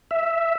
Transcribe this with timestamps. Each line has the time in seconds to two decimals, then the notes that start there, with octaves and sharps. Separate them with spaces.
0.11 E5